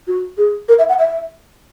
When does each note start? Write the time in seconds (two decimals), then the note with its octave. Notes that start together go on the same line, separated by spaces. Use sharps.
0.07 F#4
0.38 G#4
0.69 A#4
0.78 E5
0.89 F#5
0.99 E5